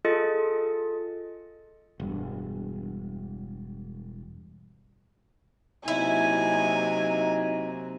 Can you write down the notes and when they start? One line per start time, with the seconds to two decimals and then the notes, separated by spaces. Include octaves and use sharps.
0.05 F4 G#4 A4 D#5 A6 C#7
2.00 E1 G2
5.88 C3 F#3 A#3 D#4 E4 G#5